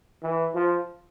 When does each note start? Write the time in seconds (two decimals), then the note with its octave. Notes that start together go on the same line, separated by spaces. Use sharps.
0.22 E3
0.55 F3